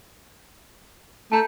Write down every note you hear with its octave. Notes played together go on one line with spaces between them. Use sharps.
A3 A5 A#5 G6